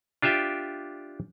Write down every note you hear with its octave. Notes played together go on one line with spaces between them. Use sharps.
D4 F4 G4 E5 G5